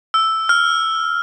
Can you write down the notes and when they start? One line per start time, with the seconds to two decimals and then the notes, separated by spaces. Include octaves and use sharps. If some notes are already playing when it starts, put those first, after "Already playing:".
0.14 E6
0.49 F6